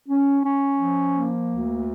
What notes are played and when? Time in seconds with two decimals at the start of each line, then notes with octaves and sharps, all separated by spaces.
0.08 C#4
0.43 C#4
0.78 F3
1.13 A#3
1.47 D2